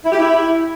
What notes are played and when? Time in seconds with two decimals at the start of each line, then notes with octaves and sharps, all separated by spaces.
0.04 E4
0.12 G4
0.20 E4